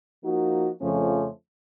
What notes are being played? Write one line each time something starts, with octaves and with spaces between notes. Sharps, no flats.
F3 A#3 D#4 F#4
F2 C#3 F3 A3 C#4